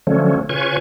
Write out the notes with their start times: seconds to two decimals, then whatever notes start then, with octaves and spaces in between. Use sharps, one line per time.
0.07 D3 F3 F#3 A3 C#4
0.49 C#3 F4 B4 C#5 G#5 C#6